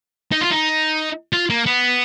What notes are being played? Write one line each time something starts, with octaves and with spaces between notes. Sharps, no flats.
D#4
F4
D#4
F4
A#3
B3